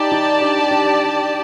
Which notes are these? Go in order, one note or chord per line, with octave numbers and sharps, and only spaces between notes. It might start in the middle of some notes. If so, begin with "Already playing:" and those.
Already playing: D#4 G4 D5 A5
D#4
D4
D4